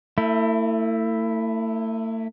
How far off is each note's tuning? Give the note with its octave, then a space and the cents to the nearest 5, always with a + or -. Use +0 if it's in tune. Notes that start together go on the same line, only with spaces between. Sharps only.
A3 +40 E4 +0